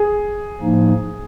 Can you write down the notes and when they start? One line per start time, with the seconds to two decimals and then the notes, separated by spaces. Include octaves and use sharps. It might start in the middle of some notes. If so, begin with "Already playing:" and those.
Already playing: G#4
0.61 A2 F3 A#3 D#4